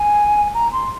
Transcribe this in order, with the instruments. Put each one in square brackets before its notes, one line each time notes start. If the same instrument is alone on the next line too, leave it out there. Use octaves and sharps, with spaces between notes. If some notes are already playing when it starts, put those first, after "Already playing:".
Already playing: [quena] G#5
A#5
C6